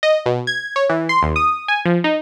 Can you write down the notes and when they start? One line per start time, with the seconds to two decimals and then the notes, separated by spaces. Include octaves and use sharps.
0.03 D#5
0.26 B2
0.47 G#6
0.76 C#5
0.89 E3
1.09 C6
1.23 D#2
1.36 D#6
1.68 G#5
1.85 F3
2.04 D#4